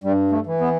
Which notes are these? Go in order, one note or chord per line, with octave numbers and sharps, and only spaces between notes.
G2 G3
A3
E3
B3